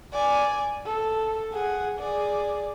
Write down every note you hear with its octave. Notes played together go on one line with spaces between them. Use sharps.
D5 G#5
A4
G#4 F#5
G#4 D5